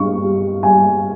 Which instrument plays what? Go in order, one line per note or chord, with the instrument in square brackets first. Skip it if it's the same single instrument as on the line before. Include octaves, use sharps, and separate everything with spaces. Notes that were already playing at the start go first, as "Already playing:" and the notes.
Already playing: [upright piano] G2 G3 C#6
G3
G3 G#5